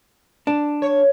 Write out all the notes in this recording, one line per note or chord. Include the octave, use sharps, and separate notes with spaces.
D4
C#5